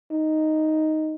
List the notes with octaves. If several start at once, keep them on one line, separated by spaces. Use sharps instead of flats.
D#4